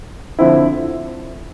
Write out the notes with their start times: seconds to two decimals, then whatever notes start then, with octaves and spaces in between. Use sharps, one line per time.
0.39 D3 F3 C4 E4